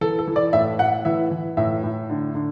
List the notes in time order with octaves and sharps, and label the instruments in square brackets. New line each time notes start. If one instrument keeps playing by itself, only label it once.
[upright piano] E3 A4
A4
E3
D5
A2 E5
A2 F#5
E3 E5
E3
A2 E5
A2
D3
D3